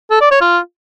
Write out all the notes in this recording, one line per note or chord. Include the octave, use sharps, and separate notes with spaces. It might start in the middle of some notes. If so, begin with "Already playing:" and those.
A4
D5
C#5
F4